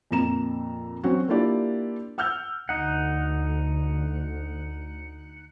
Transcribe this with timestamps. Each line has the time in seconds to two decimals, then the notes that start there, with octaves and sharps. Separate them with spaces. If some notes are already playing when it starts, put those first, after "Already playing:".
0.11 F2 A#2 A#5 E7
1.04 F#3 C4 C#4 F#4
1.28 A#3 D4 E4 F4 G4 D5
2.18 F#5 E6 F6 G6
2.69 D2 D#4 F#5